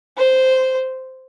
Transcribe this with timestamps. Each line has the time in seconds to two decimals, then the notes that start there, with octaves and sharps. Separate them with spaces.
0.18 C5